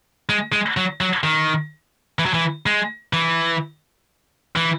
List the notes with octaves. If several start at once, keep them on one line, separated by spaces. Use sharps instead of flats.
G#3
G#3
F#3
F#3
D#3
E3
F#3
E3
G#3
E3
E3